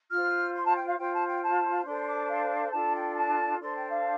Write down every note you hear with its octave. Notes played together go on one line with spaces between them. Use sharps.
F4 C5 F6
C6
A5
G5
F5
F4 C5 G5
A5
G5
A5
D4 A4 C5 C6
D6
F5
D4 F4 A4 A5
G5
A5
D4 A4 C5 C6
G5
F5